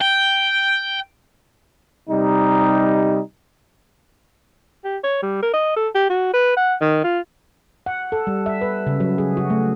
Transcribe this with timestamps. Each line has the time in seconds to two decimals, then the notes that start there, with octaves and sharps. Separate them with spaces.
0.01 G5
2.10 C3 G3 D#4
4.84 G4
5.04 C#5
5.23 G3
5.43 A#4
5.54 D#5
5.76 A4
5.95 G4
6.10 F#4
6.34 B4
6.57 F#5
6.81 D#3
7.04 F4
7.86 F#5
8.12 A4
8.27 G3
8.46 E5
8.61 B4
8.87 C#3
9.00 F#3
9.18 G#4
9.37 F#4
9.50 A3